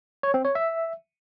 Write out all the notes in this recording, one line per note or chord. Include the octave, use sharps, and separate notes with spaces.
C#5
C4
C#5
E5